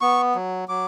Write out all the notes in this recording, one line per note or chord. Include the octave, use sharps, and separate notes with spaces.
B3 C#6
F#3
F#3 D6